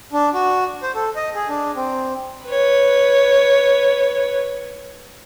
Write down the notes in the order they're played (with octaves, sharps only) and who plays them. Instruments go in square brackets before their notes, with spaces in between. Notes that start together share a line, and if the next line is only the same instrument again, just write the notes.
[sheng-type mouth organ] D4
F#4
C5
A4
D#5
G#4
D4
C4
[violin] B4 C#5